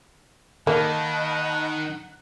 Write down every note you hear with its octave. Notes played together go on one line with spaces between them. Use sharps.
D#3 A#3 D#5 F#5 A5 B5